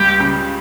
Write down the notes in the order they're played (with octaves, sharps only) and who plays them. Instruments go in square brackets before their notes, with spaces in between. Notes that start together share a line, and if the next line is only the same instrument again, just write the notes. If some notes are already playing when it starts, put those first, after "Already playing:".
Already playing: [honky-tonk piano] C#2 G3 [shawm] G4
[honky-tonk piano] C#3